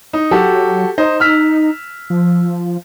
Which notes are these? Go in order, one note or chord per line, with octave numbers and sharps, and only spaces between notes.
D#4
F#3 F#4 G4 A4
D#4 C5 D#5
E6 F6 B6
F3